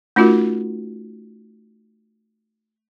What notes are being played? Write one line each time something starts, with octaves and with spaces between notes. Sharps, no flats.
A3 C#4 D#4 F4 F#4 A#4